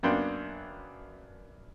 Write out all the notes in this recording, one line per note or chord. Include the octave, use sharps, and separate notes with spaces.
F#2 A#3 B3 D4 G5 C6